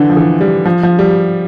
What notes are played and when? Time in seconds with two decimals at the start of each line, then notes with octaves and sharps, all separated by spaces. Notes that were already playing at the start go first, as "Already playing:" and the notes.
Already playing: D3 E3
0.10 F3
0.17 E3
0.41 G3
0.65 F3
0.83 F3
0.99 G3